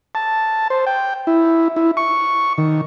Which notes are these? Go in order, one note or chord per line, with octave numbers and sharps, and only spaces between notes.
A5
C5
G5
E4
E4
C#6
D#3